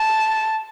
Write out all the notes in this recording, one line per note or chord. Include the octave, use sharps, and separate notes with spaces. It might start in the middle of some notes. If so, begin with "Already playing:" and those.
Already playing: A5